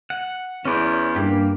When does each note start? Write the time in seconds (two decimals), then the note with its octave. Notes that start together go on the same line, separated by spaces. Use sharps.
0.10 F#5
0.65 E2 C#4 D5
1.16 G2 A#3 G4